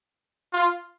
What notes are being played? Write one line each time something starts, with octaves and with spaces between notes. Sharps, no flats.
F4